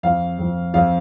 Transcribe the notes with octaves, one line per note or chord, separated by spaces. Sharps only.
F2 F3 F5
F2 F3
F2 F3 F5